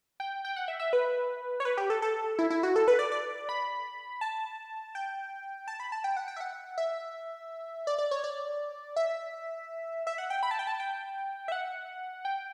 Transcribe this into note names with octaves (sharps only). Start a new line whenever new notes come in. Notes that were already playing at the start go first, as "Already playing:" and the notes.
G5
G5
F#5
E5
E5
B4
C#5
B4
G4
A4
A4
E4
E4
F#4
A4
B4
D5
D5
B5
A5
G5
A5
B5
A5
G5
F#5
G5
E5
F#5
E5
D5
D5
C#5
D5
E5
E5
F#5
G5
B5
A5
G5
A5
G5
E5
F#5
G5